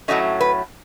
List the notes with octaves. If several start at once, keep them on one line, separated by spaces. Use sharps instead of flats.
A2 F#3 A3 C#4 D#5
B4